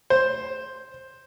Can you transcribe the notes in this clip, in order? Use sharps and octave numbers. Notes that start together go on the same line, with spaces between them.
C5